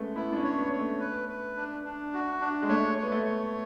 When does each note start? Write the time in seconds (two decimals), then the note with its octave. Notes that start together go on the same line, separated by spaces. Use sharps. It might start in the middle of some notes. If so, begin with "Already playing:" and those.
Already playing: G#3 A3 B3 C#4
0.16 B3 E4
0.32 D4
0.36 C#4
0.44 C#5
0.58 B3
0.73 C#5
0.79 A3
1.00 B4
1.29 B4
1.57 D4
1.85 D4
2.14 F#4
2.41 D4
2.62 G#3
2.69 A3 C#5
2.98 B3 C#5
3.12 A3
3.26 C#5